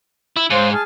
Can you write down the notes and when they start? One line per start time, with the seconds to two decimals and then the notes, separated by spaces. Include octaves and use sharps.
0.36 E4
0.50 G#2 C5 C#5 F5
0.72 G#4 A5 F6